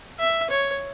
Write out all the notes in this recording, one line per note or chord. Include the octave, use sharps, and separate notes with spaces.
E5
C#5